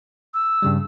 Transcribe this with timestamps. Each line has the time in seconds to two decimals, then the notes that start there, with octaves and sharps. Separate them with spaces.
0.34 E6
0.62 G2 C#3 G3